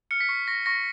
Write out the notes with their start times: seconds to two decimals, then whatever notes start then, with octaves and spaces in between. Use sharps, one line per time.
0.11 F6 C#7
0.20 B6
0.29 C#6 C7
0.48 C#6 A#6
0.66 C#6 A#6